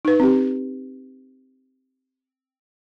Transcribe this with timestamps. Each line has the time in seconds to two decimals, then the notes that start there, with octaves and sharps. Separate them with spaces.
0.05 D#4 B4
0.20 C4 G4